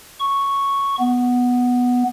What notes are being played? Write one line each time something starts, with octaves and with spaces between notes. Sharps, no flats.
C#6
B3